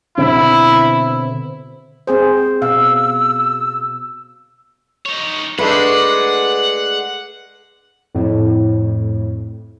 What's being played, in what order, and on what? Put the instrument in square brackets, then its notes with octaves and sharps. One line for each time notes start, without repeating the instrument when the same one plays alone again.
[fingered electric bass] B2 D3 C4 [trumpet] E4
[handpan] C4 G#4 C5
[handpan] B2 F5 [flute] E6
[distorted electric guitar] D#4 C#5
[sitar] G#3 A3 D4 [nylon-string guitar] B4 [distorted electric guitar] F#5
[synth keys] F2 A2